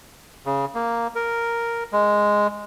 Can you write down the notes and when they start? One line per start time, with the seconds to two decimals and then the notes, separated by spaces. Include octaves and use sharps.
0.46 C#3
0.75 A#3
1.15 A#4
1.93 G#3